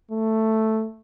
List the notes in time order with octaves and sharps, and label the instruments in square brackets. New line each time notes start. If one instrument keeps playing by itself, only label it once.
[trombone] A3